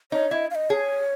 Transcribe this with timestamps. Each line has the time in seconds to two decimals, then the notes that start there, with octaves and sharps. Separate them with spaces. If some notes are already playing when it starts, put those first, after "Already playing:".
0.12 D#4 C#5
0.31 E4 D#5
0.51 F5
0.55 D#5
0.70 G#4 C#5